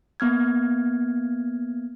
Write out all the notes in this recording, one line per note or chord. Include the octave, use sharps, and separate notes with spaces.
A#3 B3 F6 G#6